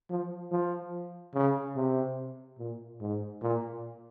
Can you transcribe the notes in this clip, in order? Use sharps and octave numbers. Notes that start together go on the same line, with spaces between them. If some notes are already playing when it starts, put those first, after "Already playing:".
F3
F3
C#3
C3
A#2
G#2
A#2